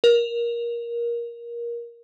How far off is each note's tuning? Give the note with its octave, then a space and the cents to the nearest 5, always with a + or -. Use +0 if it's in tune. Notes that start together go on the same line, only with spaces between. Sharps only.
A#4 +15